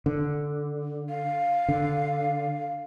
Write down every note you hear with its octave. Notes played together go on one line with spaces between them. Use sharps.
D3
F5
D3